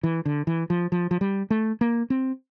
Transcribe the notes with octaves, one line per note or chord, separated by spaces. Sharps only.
E3
D3
E3
F3
F3
F3
G3
A3
A#3
C4